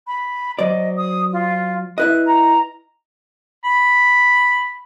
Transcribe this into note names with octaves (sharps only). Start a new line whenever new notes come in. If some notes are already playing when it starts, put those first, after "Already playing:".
B5
F#3 C5 D5 D#5
D#6
F4
E4 B4 D#5 F#6
A#5
B5